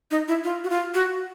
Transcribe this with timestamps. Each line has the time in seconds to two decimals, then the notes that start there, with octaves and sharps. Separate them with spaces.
0.11 D#4
0.28 E4
0.44 F4
0.64 F#4
0.70 F4
0.94 F#4